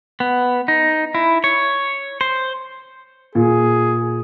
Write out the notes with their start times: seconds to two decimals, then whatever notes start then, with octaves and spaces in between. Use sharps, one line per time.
0.20 B3
0.68 D#4
1.15 E4
1.44 C#5
2.21 C5
3.35 A#2 G#4